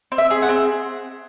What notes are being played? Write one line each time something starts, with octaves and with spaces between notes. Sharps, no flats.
C4
E5
G#4
F#5
C4